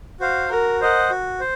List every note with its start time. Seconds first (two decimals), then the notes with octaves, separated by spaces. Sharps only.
0.20 F#4 C5 F5
0.49 F#4 A#4
0.81 C5 D#5 F#5
1.10 F#4
1.40 C5